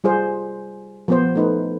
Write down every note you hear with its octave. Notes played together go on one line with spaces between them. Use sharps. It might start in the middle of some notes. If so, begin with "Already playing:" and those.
G3 F4 G#4 C5
F3 B3 C5
A3 D#4 B4